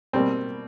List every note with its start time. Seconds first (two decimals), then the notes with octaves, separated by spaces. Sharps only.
0.13 B2 G3 A#3 C4